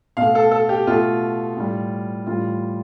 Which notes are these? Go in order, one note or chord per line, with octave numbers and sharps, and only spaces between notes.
B2 A3 F5
A4
A4
G4
B2 A3 F4
A2 G3
A2 E3 G3 F4